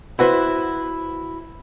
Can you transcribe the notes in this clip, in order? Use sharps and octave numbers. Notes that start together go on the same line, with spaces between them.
E4 F#4 B4 C5